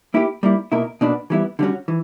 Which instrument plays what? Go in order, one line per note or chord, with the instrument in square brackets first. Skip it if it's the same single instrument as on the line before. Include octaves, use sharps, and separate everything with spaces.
[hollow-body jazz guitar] A#3 E4 G4
G3 A#3 E4
B2 A#3 E4 A#4
B2 A#3 D4 F#4 B4
E3 G3 B3 E4
D3 G3 C#4 F#4
E3